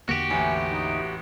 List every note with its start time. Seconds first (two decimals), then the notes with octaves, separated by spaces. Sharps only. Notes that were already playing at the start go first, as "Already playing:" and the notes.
0.09 E2 D3 A#3 F#4 G4
0.30 A1 A2 G#5
0.68 D#4